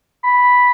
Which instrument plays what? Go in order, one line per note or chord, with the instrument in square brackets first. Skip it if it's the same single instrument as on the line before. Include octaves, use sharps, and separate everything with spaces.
[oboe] B5